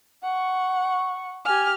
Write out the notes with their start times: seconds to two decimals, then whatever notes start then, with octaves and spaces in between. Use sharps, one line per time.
0.23 F#5 C#6
1.45 G4 G#5 F6